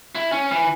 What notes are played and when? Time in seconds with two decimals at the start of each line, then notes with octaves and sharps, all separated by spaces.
0.15 E4
0.32 C#4
0.51 E3